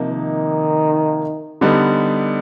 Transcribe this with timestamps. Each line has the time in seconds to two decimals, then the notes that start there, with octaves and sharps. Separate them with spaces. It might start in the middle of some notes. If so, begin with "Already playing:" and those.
Already playing: C3 F3 A#3 D#4
0.10 D#3
1.61 D3 G3 B3 D#4